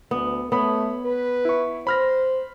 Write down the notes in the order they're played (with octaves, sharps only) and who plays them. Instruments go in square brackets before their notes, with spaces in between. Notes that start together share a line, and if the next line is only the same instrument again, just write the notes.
[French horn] D2 [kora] B3
[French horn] A3 [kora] B3 [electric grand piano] C#5 B5
[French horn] B4
[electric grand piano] E4 C#6
[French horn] C5 [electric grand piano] B5 F6 A#6